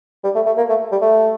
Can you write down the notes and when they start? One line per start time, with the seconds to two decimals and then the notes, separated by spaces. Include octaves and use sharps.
0.24 G3
0.35 A3
0.46 A3
0.57 A#3
0.69 A3
0.92 G3
1.02 A3